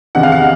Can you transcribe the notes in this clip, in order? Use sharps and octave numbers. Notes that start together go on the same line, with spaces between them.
E2 C3 D#3 F#5
F5
F#5